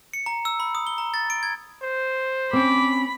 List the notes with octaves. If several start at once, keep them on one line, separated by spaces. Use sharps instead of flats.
C#7
A#5
E6
B5
D#6
G7
A#5
A6
D7
G#6
C5
C4 C#4 B5 D6